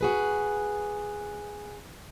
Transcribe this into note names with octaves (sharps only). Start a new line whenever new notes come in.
F#4 G#4 B4